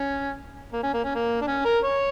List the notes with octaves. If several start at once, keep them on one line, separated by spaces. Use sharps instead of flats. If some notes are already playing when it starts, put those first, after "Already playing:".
Already playing: C#4
A#3
C#4
A#3
C#4
A#3
D4
C#4
A#4
C#5